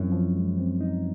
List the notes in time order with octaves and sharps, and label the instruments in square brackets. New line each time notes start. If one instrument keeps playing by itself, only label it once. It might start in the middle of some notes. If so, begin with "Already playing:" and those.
Already playing: [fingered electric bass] F#2 [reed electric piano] F3 C4 E4
[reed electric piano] F3
G#3
C4
D#4